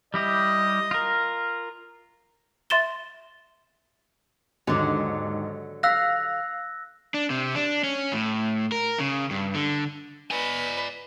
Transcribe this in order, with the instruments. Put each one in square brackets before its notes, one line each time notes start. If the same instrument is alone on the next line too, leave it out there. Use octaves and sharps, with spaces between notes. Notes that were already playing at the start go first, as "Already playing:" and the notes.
[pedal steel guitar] G3 E4 G4 [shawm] D#5
[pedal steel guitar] F4 A#4
[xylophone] E5 C6 A6 E7 G7
[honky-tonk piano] D#2 G#2 [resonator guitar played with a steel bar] D3 F#3
[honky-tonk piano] F5 B6 [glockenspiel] E6 F#6 A#6
[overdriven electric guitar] D4
C3
D4
C#4
A2
A#4
C#3
G2
D3
[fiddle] B4 D#5 [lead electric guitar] D5 G#5